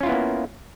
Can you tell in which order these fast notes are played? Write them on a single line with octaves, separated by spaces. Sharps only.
C#4 F4 E4 B3 A#3